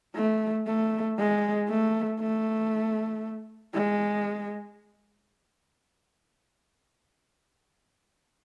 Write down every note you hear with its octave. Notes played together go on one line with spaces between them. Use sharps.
A3
A3
G#3
A3
A3
G#3